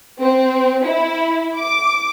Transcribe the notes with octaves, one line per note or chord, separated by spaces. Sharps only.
C4
E4
D6